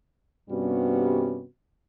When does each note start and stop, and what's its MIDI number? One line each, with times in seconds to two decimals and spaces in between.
0.50 1.44 43
0.50 1.44 48
0.50 1.44 55
0.50 1.44 59
0.50 1.44 61
0.50 1.44 66